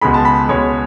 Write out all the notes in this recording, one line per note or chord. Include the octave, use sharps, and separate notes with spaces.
C#2 B2 G#3 B5
A5
B5
C#2 B2 G#3 C#5